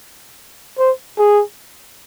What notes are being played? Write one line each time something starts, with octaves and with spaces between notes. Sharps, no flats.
C5
G#4